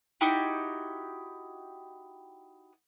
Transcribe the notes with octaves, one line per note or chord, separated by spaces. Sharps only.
D#4 E4 F#4 G4